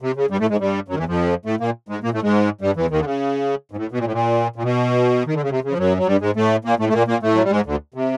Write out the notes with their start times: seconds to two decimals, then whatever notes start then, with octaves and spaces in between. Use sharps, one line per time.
0.02 C3
0.16 C#3
0.30 G2 G3
0.40 A2 A3
0.50 G#2 G#3
0.60 G2 G3
0.88 F#2 F#3
0.93 D#3
0.98 E2 E3
1.08 F2 F3
1.45 A2 A3
1.60 A#2 A#3
1.89 G#2 G#3
2.03 A#2 A#3
2.13 A2 A3
2.22 G#2 G#3
2.61 G2 G3
2.76 E2 E3
2.90 D#2 D#3
3.00 D3
3.05 C#3
3.71 G#2
3.77 A2
3.91 B2
3.98 A#2
4.05 A2
4.12 A#2
4.56 A#2
4.63 B2
5.27 D#3
5.34 D3
5.42 C#3
5.50 C3
5.64 C#3
5.71 F3
5.78 F#2 F#3
5.97 F#3
6.07 G2 G3
6.21 G#2 G#3
6.36 A2 A3
6.65 A#2 A#3
6.79 A2 A3
6.89 A3
6.93 A#2 A#3
7.08 A#2 A#3
7.22 A2 A3
7.35 F#3
7.44 G3
7.50 G#2 G#3
7.66 D2 D3
7.94 C3